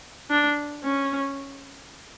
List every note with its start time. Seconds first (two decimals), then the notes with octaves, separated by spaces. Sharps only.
0.30 D4
0.84 C#4